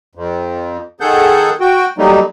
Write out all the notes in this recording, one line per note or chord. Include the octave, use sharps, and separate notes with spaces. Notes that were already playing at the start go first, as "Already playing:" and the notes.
F2
D#3 G#4 A4 F#5 G6
F#4 G5
F#3 G3 A3 A#3 D#4